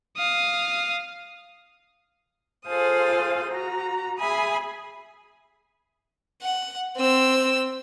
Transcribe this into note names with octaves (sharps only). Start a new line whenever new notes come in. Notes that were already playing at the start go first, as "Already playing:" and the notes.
F5 D#6
F4 G#4 A4 C5 F5 D#6
F#4 A#5
G#4 E5 G#5 B5 D#6
F#5
C4 E6